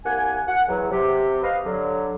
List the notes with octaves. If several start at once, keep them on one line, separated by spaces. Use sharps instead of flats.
C2 A#3 F#5 G#5
F#5
E2 F#3
C3 G4
B4 D#5 F5
D3 F#3